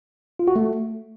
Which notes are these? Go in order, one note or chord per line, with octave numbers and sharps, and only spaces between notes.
F4
F#4
A3